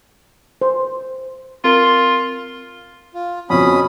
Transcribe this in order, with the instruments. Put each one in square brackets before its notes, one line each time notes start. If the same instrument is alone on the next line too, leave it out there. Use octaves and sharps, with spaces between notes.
[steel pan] C5
[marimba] C4 A#4 [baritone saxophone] F4
[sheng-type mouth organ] F4
[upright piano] F2 B2 [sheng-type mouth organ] C#4 B5 D#6